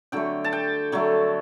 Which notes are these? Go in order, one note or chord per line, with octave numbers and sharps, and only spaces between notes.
D3 F#3 A3 G5
A5
G5
D3 F#3 A3